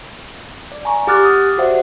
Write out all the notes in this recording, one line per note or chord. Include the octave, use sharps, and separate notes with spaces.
D5
G#5 A#5 C#6
G4 F#5 D6 F6 F#6 A6
D#6
F#4 G4 C5 D5 E5 F#5